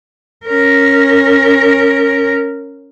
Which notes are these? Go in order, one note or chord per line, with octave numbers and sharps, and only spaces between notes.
C#4 A#4